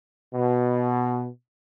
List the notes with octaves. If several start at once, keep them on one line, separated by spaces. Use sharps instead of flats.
B2